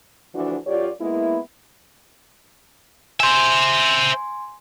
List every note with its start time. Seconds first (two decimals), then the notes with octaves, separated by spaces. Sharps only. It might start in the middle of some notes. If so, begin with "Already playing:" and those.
0.34 D2 E3 F3 D4 F#4 D5
0.66 F#2 F4 G4 C#5 D5
1.01 G#3 A#3 B3 E4
3.20 C5 E5 G#5 C6